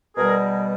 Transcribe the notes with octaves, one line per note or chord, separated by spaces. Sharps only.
B2 G3 G#4 A#4